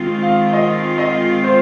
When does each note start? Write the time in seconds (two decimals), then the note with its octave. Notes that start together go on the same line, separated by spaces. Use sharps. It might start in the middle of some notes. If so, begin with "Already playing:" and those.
Already playing: D#3 G#3 C4 F4
0.23 F5
0.53 D#5
0.98 D#5
1.44 C5